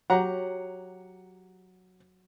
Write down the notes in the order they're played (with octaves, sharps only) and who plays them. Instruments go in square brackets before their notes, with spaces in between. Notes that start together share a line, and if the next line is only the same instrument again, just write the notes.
[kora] F#3 G4 [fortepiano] F#5 A#5